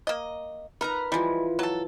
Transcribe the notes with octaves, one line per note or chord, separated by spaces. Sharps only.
A#3 D#5
D#4 A#4 B4 A#5
E3 F3 G3 G#3
F#3 A4 A5